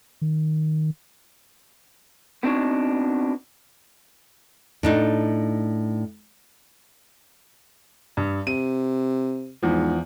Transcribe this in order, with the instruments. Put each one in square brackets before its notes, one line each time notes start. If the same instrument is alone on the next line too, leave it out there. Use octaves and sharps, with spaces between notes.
[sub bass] D#3
[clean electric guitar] B3 C4 D4 D#4 F#4 C#5
[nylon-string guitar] A2 D4 D#4
[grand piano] G2
[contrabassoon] C3 [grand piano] D#7
[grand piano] E2 F3 [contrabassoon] G#2